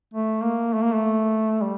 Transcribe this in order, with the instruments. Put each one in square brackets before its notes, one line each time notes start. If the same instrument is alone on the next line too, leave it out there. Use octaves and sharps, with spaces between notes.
[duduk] A3
A#3
A3
A#3
A3
G3